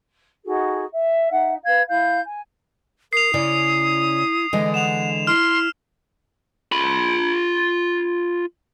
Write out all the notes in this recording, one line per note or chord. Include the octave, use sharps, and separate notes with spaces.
D#4 F#4 G#4 A4
E5
D#4 E5 F#5
B4 F5 G#6
E4 F5 G6
G#5
A#4 D#6 C7 F7
C#3 C#4 E4 D5
D3 E3 G#3 D#5
F#5 E7 F7
E4 C6 F6
F4 B5